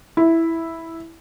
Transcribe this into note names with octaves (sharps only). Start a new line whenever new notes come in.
E4